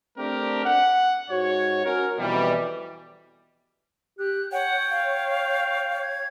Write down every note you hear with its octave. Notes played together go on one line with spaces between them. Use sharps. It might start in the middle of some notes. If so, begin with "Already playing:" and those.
A3 C4 D4 G4 A#4
F#5
G#2 F#4 C#5
C#4 F#4 A#4
F2 B2 E3 G3
G4 F#6
C#5 F#5 G5
F5
G#6